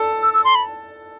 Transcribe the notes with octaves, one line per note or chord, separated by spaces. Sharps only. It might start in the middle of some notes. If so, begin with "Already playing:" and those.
Already playing: A4 A5
E6
E6
C6
B5